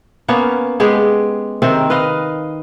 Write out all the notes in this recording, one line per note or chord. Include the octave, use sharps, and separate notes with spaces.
A#3 B3 C#4 C#5
G#3 B3 G4 G#4
C3 D#3 C4 A#4
B4 D#5 F5